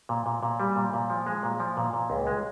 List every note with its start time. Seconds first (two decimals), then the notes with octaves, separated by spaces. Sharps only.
0.09 A#2
0.26 A#2
0.43 A#2
0.60 G3
0.76 A#2
0.93 A#2
1.10 F3
1.26 G#3
1.43 A#2
1.60 F3
1.77 A#2
1.93 A#2
2.10 C#2
2.27 G#3